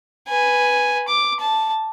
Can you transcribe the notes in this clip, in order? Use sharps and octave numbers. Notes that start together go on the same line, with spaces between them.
B4 G#5
D6
A5